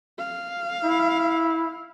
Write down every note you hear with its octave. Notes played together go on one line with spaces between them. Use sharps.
F5
E4